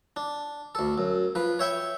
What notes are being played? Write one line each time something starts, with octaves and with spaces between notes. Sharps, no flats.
D4
D2 A4
F#2
F3 B4
C#5 E5 G5 C#6